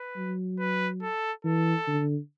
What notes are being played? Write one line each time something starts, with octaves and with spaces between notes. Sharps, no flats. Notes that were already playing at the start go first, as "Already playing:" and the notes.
Already playing: B4
F#3
B4
A4
E3 A4
D3